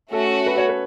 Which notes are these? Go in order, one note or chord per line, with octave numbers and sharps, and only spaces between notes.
A3 C#4 F#4 A4
B4
C#5
B4